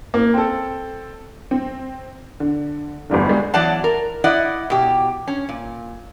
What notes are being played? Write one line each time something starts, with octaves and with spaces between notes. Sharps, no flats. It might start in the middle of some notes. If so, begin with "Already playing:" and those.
A#3
C4 A4
C4
D3
G1 E2 G2 D3
G3 G#3
E2 F#3 D5 F#5 A5
A#4
E4 D5 D#5 F#5
B2 G4
C#4
A#2